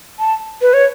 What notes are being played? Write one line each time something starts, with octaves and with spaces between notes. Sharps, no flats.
A5
B4
C#5